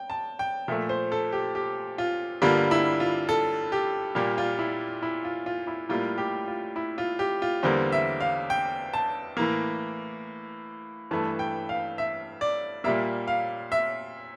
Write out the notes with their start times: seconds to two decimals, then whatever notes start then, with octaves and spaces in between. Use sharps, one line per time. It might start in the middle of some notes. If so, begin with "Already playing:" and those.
Already playing: G5
0.10 A5
0.39 G5
0.68 A#2 F3 A3 E5
0.89 C5
1.12 A4
1.32 G4
1.55 G4
1.98 F4
2.42 G2 D3 G3 A#3 F4
2.71 E4
3.00 F4
3.29 A4
3.72 G4
4.15 A#2 G3 A#3 G4
4.38 F4
4.59 E4
5.02 E4
5.24 F4
5.46 F4
5.67 E4
5.89 A2 G3 A#3 F4
6.18 G4
6.48 F4
6.76 E4
6.98 F4
7.19 G4
7.42 F4
7.63 E2 D3 G3 A#3 C5
7.92 E5
8.21 F5
8.50 G5
8.93 A5
9.37 A2 E3 A#3
11.11 G2 E3 A3 A5
11.39 G5
11.69 F5
11.98 E5
12.41 D5
12.84 A#2 G3 A#3 E5
13.28 F5
13.72 E5